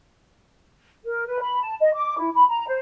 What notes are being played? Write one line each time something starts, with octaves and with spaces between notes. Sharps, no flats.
A#4
B4
B5
A5
D#5
D6
E4
B5
A#5
C5